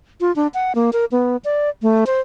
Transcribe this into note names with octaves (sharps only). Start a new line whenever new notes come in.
F4
D4
F#5
A#3
A#4
B3
D5
A3
C5